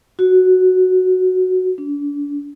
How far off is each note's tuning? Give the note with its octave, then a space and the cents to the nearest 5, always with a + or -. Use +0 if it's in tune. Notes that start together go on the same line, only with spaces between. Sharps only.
F#4 +0
D4 -35